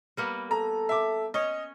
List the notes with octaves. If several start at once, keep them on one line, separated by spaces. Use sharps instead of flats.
G3 A#3 B3
A4 A#5
E5 D6
C#4 C#5 D#5